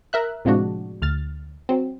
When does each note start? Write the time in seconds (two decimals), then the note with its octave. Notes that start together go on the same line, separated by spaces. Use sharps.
0.13 A#4 E5 F#6
0.45 A2 C3 F3 G#3 D4 F#4
1.02 D2 F6 A6
1.69 F#3 C4